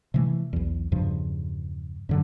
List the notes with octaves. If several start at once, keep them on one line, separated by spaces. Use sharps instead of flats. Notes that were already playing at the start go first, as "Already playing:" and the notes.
C3 E3 A3
B1 E2
E2 G2 C#3 F3
F#2 D3 F#3